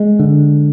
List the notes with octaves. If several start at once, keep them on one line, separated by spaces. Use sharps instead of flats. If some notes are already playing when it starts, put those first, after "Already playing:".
Already playing: G#3
D3